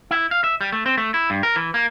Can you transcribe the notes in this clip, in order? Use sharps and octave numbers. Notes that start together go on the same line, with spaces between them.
E4
F5
E5
G3
A3
C4
A3
E4
G2
A#4
E3
A#3